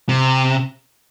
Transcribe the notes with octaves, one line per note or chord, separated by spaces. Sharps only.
C3